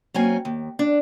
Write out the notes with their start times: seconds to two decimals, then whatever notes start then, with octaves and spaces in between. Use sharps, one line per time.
0.14 F#3 A#3 C4 C#4 G#5
0.45 D#2
0.79 D4